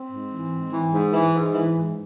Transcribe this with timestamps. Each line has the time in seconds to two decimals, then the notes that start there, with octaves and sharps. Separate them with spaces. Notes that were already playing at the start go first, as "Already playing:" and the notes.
Already playing: C4
0.12 G#2
0.32 E3
0.52 G#2
0.73 E3
0.93 G#2
1.13 E3
1.34 G#2
1.54 E3
1.75 G#2